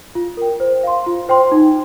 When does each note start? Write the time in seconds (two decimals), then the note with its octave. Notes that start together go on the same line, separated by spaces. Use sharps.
0.15 F4
0.37 A#4 G5
0.60 C5
0.83 F5 C6
1.06 F4
1.29 C5 G5 C6
1.52 D#4